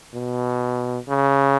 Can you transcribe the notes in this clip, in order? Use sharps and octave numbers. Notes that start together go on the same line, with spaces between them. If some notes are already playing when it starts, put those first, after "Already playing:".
B2
C#3